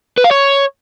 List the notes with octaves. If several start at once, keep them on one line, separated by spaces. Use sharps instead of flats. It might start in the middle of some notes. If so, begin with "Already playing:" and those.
B4
F5
C#5